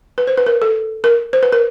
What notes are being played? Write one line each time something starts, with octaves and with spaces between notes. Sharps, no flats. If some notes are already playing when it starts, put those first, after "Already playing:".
B4
C5
B4
A#4
A4
A#4
C5
B4
A#4